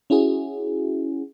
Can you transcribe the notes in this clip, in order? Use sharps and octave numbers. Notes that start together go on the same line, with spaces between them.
C#4 E4 F#4 G#4